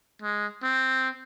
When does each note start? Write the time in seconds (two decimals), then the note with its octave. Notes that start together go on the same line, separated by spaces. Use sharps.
0.22 G#3
0.63 C4